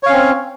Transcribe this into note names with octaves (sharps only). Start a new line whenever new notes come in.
C4 C#4 C#5 F5